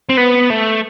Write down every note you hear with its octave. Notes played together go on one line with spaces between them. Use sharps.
C4
B3
A3